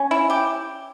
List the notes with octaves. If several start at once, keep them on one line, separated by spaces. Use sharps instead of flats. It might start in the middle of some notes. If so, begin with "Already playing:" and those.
Already playing: C#4
E4
G4